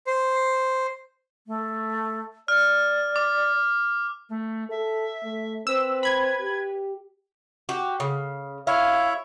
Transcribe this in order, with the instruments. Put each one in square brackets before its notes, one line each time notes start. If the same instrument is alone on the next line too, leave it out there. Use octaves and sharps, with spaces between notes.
[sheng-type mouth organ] C5
[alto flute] A3
[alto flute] D5 [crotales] F6
[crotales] D6
[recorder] A3
[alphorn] A4 [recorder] E5
[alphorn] A3
[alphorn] C4 [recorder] B4 [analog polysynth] E6
[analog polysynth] B5 G#6
[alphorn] G4
[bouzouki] F#4 G4
C#3
[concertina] E4 C#5 E5 [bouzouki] F5